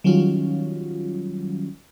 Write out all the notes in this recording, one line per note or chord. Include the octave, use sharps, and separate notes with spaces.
D#3 F#3 G3 C#4 F4